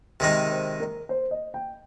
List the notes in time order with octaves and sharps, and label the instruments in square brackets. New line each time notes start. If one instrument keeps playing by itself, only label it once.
[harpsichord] C3 D#3 G#3 D#4 [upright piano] A#4
[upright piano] C5
A#4
C5
D#5
G5